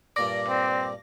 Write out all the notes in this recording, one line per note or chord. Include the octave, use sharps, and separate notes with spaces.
G2 A#2 D5 D6 A#6
C4